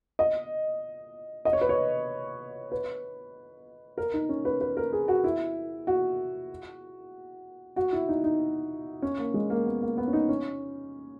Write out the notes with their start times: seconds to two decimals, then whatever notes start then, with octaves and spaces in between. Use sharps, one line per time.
0.19 D#5
1.45 D#5
1.53 C#5
1.61 B4
1.69 C#5
2.72 B4
3.98 A#4
4.14 D#4
4.29 C#4
4.45 B4
4.61 B4
4.77 A#4
4.93 G#4
5.08 F#4
5.24 E4
5.87 F#4
7.76 F#4
7.93 E4
8.08 D#4
8.24 D#4
9.02 C#4
9.18 A#3
9.34 G#3
9.50 A#3
9.66 B3
9.82 A#3
9.97 B3
10.07 C#4
10.13 D#4
10.29 C#4